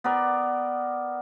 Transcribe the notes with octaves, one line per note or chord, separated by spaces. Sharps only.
B3 A#4 D5